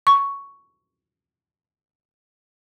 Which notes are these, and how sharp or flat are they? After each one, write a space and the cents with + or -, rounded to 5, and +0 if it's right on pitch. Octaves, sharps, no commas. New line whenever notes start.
C#6 +5